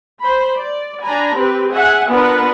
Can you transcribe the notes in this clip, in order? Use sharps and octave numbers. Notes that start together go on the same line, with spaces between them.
C5 B5
D5
D4 G#5 A#5 B5
C4 G4 B4
G#4 E5 F#5 G#5
B3 D4 F4 A#4 B4 F#5